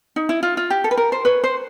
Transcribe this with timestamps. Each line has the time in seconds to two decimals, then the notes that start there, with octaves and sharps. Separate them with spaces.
0.16 D#4
0.29 E4
0.43 F4
0.57 F4
0.70 G4
0.84 A4
0.91 B4
0.97 A#4
1.12 C5
1.25 B4 C#5
1.44 C5